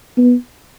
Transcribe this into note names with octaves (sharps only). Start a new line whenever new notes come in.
B3